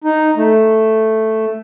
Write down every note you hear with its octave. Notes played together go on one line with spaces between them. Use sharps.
D#4
A3